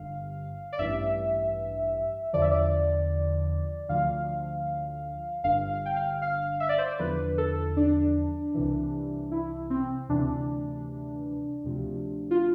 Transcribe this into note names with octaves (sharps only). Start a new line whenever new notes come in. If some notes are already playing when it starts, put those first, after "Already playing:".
Already playing: G1 G2 D3 F5
D5
A1 G2 E3 E5
E2 D3 F3 D5
E5
D5
D2 D3 F3 F5
G1 G2 D3 F5
F5
G5
F5
F5
E5
D5
C5
D5
E2 D3 F3 B4
A4
D4
C2 C3 E3
E4
C4
D2 C3 E3 D4
D2 C3 F3
F4